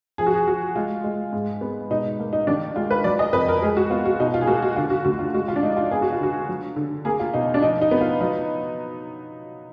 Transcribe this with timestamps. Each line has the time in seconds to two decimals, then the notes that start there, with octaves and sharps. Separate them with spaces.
0.18 F3 G#4
0.26 F#4
0.34 G#4
0.47 F3 F#4
0.76 G#3 F4
1.04 G#3
1.33 G#2
1.61 B3
1.90 B2 D#4
2.19 A#3
2.33 D#4
2.47 D#3 D4
2.76 G#3 F4
2.91 B4
3.04 F#3 D5
3.19 D#5
3.33 F2 B4
3.48 A#4
3.62 G#3 G#4
3.77 F#4
3.90 B3 F4
4.06 F#4
4.19 B2 D#4
4.34 F4
4.41 G#4
4.47 A#3 F#4
4.62 F#4
4.76 D3 F4
4.90 F#4
5.05 D2 F#4
5.19 F4
5.34 G#3 F#4
5.48 F4
5.56 D4
5.63 G#3 D#4
5.77 F4
5.91 B3 G#4
6.02 F#4
6.12 F4
6.20 D3 F#4
6.49 F#3
6.76 D3
7.05 A#3 G#4
7.20 F4
7.34 B2 D#4
7.54 D4
7.62 F3 D#4
7.81 D#4
7.91 B3
8.01 F4
8.21 F#3 D#4